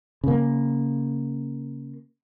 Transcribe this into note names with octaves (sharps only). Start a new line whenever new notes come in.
C#3 A#3